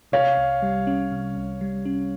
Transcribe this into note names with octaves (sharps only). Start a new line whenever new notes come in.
C3 C#5 F5
C2
G3
C#4
C3
C2
G3
C#4